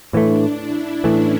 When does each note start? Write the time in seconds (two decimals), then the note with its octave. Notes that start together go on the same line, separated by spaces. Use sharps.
0.13 A2 E3 A3 D4
0.58 E4
1.04 A2 E3 A3 C#4